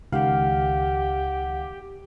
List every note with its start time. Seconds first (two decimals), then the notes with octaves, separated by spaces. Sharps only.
0.12 C#2 D#3 G4 F5 F#5